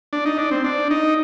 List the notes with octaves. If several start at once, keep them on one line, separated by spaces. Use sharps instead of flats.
D4
D#4
D4
C4
D4
D#4